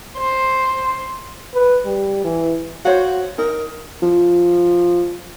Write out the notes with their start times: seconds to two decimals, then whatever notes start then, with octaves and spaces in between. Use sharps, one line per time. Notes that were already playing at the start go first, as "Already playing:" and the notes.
0.17 C5
1.55 B4
1.85 G3
2.24 E3
2.85 F#4 C5 C#5 F5
3.38 D#4 A#4
4.02 F3